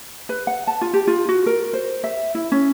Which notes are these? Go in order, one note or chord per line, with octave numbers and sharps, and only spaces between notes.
B4
F#5
A5
F4
G4
F4
F#4
A#4
C5
E5
E4
C#4